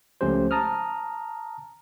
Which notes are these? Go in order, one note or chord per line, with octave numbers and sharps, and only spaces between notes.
C#2 F3 A3 C#4 G4 C5
A5 A#5 D#6 F6